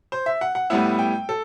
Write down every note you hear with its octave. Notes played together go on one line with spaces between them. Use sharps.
C5
E5
F#5
F#5
A2 G3 B3 E4 F#5
G5
A4